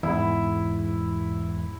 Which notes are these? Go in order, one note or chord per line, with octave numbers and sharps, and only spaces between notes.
E2 G#2 E4